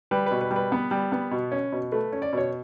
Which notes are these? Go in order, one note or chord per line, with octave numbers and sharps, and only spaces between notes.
G3 B4
B2 B4
B4
G3
B4
B3
G3
B3
B2
C#4
B2
A3 B4
C#4
D5
B2 C#5